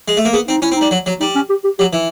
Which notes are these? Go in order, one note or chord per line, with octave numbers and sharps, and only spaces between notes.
G#3
A3
A#3
B3 G#4
C4 D#4
C#4 E4
C4
D#4
G3
F#3
F#3
G3 D#4
C#4
G4
G4
F#3 G4
E3